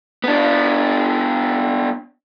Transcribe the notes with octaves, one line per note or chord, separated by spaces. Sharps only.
B3 D4